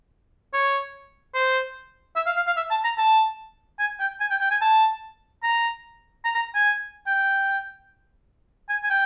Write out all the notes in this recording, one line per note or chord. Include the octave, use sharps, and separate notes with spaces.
C#5
C5
E5
F5
F5
F5
E5
A5
A#5
A5
G#5
G5
G#5
G5
G5
G#5
A5
A#5
A#5
A#5
G#5
G5
G#5
G#5
G5